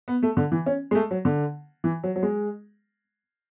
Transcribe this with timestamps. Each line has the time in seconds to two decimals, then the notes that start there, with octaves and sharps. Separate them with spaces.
0.08 B3
0.23 A3
0.37 D3
0.52 E3
0.66 C#4
0.91 G#3
0.95 A3
1.11 F#3
1.25 D3
1.84 E3
2.03 F#3
2.16 F#3
2.23 G#3